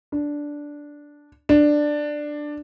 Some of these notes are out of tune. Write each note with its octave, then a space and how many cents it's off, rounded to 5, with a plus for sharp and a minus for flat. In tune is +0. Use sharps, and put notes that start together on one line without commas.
D4 -5
D4 +10